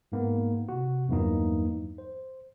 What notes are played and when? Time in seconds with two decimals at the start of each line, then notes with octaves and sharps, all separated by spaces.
0.12 G#2 A#3 B3
0.69 C3 F#4
1.09 E2 G2 E3 F#3 A#3 D#4
1.98 C5